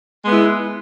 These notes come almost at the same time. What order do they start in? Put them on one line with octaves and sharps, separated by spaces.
G#3 B3 E4